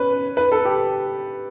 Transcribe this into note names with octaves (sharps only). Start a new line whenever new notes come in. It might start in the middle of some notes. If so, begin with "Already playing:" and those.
Already playing: C#4 B4
B4
A4
G4